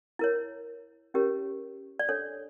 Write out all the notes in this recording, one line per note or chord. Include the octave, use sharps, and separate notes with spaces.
E4 A#4 C#5
C#4 E4 G4 A#4 C#5
D5
D4 A4 C#5